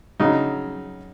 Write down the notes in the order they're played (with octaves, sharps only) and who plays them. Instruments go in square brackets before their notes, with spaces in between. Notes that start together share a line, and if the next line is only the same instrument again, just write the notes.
[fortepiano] C#3 F#3 D#4